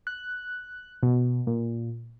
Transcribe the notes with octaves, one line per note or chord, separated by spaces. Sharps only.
F#6
B2
A#2